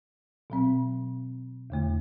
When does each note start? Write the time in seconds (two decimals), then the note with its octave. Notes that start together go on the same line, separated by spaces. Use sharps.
0.50 B2 F#3 C4
1.70 E2 D3 A3 E4